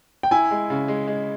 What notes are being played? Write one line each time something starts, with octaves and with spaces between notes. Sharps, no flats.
G5
E4 G#5
G#3
C#3
G#3
G#3